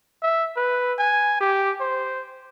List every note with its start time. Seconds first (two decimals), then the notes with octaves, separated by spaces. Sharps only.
0.23 E5
0.57 B4
0.99 G#5
1.41 G4
1.80 C5